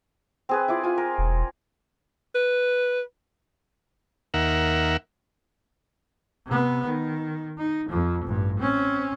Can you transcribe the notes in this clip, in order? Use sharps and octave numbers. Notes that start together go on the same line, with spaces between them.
C4 G#4 B4
E4 F4 D5
F4 G#5
A#4
E1
B4
D#2 A#4 E5 F#5
C3 B3
D#3
D#4
F2 F3
A1 G2
C4 C#4